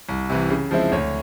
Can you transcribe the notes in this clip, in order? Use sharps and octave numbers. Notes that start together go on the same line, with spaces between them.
C2
C3 E3
C#3
F3 G#3 C4 E4
D2 C#5